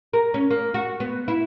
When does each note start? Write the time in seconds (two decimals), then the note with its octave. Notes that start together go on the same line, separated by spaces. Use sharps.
0.13 A#4
0.34 C#4
0.50 A#3
0.74 F#4
1.00 B3
1.28 E4